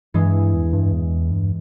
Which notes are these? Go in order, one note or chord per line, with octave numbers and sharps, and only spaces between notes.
G2 E3 G#3
E2
G2
E2
G2